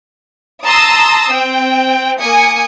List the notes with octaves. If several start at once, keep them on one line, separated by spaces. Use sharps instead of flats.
A5 A#5 C6 D#6 E6
C4 G5
A#3 G#5 D#6 C#7